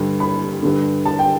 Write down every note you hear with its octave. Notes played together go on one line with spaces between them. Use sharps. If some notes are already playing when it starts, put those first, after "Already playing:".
Already playing: G2 D3
B5
G2 D3
A5
G5